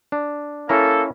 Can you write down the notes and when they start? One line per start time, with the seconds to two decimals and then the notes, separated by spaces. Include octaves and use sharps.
0.12 D4
0.69 A#3 C#4 E4 A4 A#5